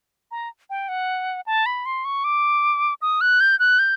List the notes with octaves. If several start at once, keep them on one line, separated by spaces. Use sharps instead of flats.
A#5
G5
F#5
A5
B5
C6
C#6
D6
D#6
F#6
G6
F#6
G6